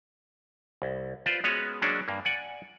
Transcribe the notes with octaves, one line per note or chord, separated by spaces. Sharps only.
C2
F4 B4 C5 D5
G#3 B3 C#4 F#4 B4 C#5
F#3 G#3 A#3 C#4 D4 F#4
G2 A#3
D5 F#5 G#5